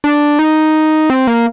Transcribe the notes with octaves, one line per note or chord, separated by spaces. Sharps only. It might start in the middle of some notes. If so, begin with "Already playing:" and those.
D4
D#4
C4
A#3